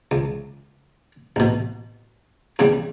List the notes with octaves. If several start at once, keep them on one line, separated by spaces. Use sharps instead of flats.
C#2
A1 B2
E2 C#3 G3